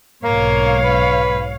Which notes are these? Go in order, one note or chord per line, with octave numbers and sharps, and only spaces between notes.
B1 G#2 A#3 C#5 F5
B4